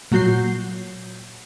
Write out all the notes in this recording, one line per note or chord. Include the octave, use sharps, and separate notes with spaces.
A#2 F#3 F#4 G6 C7